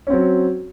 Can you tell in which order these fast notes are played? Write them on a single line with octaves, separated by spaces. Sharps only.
C#4 C4 F#3